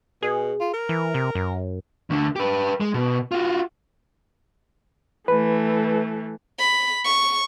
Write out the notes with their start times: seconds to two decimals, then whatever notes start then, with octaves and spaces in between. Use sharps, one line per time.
0.22 B2 G#4
0.60 F4
0.74 A#4
0.89 E3
1.14 C3
1.35 F#2
2.10 D2 D3
2.36 G4 B4
2.80 G#3
2.94 B2
3.31 F4 F#4
5.28 E3 A3 B4
6.59 B5
7.04 C#6